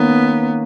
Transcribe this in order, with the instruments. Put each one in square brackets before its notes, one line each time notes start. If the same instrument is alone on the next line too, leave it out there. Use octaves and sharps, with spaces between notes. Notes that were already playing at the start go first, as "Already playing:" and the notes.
Already playing: [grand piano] D#3 A#3 C#4 [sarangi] B3